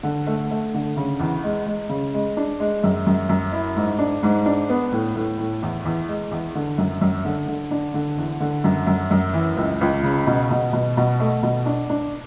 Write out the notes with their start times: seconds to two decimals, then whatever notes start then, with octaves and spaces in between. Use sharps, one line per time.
0.03 D3
0.27 A3
0.51 A3
0.74 D3
0.97 C#3
1.20 E2
1.44 G#3
1.67 G#3
1.89 C#3
2.14 G#3
2.37 D4
2.60 G#3
2.84 F#2
3.07 F#2
3.29 F#2
3.52 E4
3.76 G#2
3.99 D4
4.23 G#2
4.46 D4
4.69 B3
4.92 A2
5.15 A2
5.38 A2
5.62 E2
5.85 E2
6.08 G#3
6.31 E2
6.55 D3
6.78 F#2
7.01 F#2
7.25 D3
7.48 D3
7.71 D4
7.94 D3
8.17 E2
8.40 D3
8.64 F#2
8.87 F#2
9.11 F#2
9.34 E3
9.57 C#2
9.81 C#2
10.03 C#3
10.27 B2
10.51 B2
10.73 B2
10.97 B2
11.20 A3
11.43 B2
11.66 D4
11.90 D4